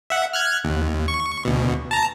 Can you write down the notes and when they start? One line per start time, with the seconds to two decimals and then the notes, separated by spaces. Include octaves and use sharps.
0.10 E5 F#5
0.33 F6 F#6 G#6
0.64 D#2
1.08 C#6
1.45 D2 B2
1.91 A5 A#5